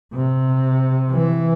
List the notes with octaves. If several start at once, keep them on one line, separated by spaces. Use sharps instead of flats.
C3
E3